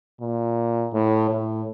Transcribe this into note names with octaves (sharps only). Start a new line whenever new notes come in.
A#2
A2
A2